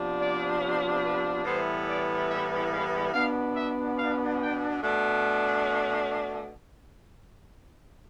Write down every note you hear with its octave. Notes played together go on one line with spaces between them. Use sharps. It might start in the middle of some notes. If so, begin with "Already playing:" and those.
Already playing: C3 F3 B3 D4
D5
B4
A2 E3 G3 B3 C5
D5
E5
F5
B2 B3 D4 F5
E5
F5
G5
B2 A3 D4